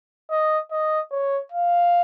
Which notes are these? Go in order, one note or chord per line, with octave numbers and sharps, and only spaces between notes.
D#5
D#5
C#5
F5